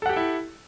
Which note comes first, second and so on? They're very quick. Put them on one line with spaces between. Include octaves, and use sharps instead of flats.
A4 F#5 G4 G5 E4